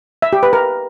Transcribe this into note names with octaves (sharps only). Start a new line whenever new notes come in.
E5
G4
B4
A#4